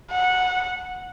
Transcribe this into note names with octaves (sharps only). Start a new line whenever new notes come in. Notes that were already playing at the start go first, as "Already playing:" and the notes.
F#5